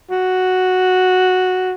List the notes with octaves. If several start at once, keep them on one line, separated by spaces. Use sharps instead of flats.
F#4